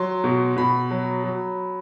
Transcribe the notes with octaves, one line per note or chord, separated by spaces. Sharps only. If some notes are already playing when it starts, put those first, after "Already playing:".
Already playing: F#3 C6
B2
B2 B5
F#3
F#3